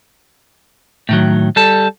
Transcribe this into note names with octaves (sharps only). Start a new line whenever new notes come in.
A2 D#3 F#3
G3 A4